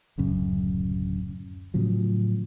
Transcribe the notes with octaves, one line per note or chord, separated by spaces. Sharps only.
D1 F#2 C#3
A2 C#3 F3 F#3